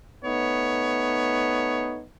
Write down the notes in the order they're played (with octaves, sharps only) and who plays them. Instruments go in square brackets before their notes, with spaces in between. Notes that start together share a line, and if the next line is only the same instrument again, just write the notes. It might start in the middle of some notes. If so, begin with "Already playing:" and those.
[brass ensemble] A3 B3 D#4 C#5